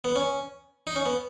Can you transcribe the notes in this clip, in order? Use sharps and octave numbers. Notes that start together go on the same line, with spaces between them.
B3
C#4
D#4
C#4
B3